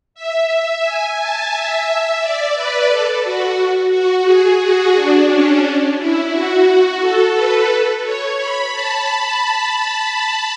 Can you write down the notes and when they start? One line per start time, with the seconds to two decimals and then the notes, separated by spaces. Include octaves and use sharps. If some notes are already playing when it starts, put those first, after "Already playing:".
0.14 E5
0.83 G#5
1.17 A5
1.52 E5
2.20 D5
2.55 B4
2.88 A4
3.23 F#4
3.92 F#4
4.26 G#4
4.60 F#4
4.95 D4
5.29 C#4
5.97 E4
6.32 F#4
7.00 A4
7.34 B4
8.03 C#5
8.38 B5
8.72 A5